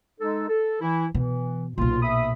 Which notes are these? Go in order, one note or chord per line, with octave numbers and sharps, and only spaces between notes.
G#3 D#4 A4
A4
E3 E4
B2 E3
B1 A#2 F4
E5 B5 D#6